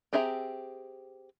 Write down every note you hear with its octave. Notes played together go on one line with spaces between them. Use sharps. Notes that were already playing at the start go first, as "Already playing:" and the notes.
C4 G4 G#4 E5 A#5